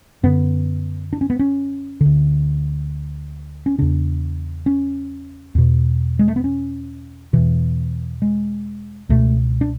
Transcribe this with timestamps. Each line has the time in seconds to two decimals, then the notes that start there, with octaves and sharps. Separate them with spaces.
0.23 F#2 D3 B3
1.13 D4
1.21 C#4
1.30 B3
1.39 C#4
2.01 D2 D3
3.66 C#4
3.78 E2 C#3 D4
4.66 C#4
5.55 E2 B2
6.19 G#3
6.28 A3
6.36 B3
6.44 C#4
7.33 E2 B2 E3
8.22 G#3
9.09 C#2 B2 A3
9.61 D4